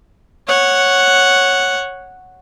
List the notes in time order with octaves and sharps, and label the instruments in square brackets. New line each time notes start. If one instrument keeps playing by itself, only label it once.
[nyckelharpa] C#5 F#5